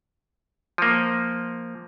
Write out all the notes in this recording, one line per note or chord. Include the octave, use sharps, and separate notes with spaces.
F3 A#3